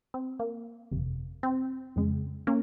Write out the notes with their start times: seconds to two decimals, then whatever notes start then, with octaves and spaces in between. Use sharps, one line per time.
0.14 C4
0.39 A#3
0.91 G1 F2 C3
1.43 C4
1.96 F2 C#3 G#3
2.47 A#3 C#4